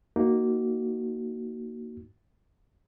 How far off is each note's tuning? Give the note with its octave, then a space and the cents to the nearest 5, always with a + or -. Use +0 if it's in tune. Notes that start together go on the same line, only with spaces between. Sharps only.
A#3 +0 D#4 +0 F#4 +15